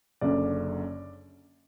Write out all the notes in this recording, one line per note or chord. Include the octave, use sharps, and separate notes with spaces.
F#1 F#2 D3 D5